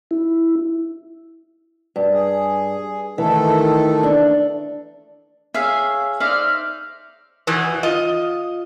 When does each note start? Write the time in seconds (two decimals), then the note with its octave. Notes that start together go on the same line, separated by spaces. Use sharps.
0.11 E4
1.96 G2
2.12 G#4
3.18 D#3 E3 A3 A4
4.03 D4
5.54 G#4 C#5 E5 F5
6.20 D#4 C5 D5 E5 F6
7.47 E2 B2 E3
7.83 F4 D#5